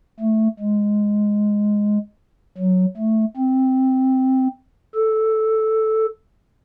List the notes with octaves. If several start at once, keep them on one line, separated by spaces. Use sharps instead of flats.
A3
G#3
F#3
A3
C4
A4